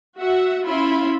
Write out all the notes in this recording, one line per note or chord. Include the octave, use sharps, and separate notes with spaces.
F#4 E5 F#5
C#4 E4 F4 E5 B5 C6